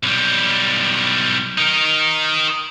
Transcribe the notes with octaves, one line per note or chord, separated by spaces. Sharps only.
B1 G3
D#4 A#4